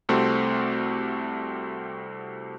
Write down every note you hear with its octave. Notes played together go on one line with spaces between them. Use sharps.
C2 A3 C4 F#4 G4 C6